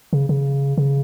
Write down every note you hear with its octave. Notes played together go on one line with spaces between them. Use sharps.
C#3
C#3
C#3